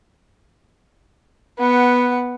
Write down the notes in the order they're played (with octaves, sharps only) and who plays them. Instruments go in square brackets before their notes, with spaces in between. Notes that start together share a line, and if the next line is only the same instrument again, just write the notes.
[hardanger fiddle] B3 F#5